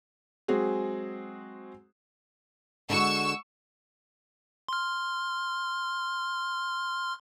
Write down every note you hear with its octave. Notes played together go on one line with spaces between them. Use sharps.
F#3 G#3 C4 F#4 G#4
D3 G#3 F#4 C#6 E6
C6 F6